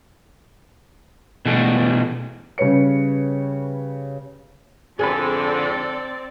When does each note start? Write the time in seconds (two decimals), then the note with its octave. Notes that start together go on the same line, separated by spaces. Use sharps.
1.46 B2 E3 G3 A3
2.58 C#3 G3 B4 C#5 C#7
4.99 F2 G#2 D3 C4 G#4 A4 B4 D5